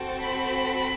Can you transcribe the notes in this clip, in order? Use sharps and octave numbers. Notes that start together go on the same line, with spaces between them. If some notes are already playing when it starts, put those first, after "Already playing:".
Already playing: C4 F#4 A4
B5